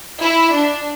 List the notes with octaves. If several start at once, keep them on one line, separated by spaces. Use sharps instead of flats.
E4
D4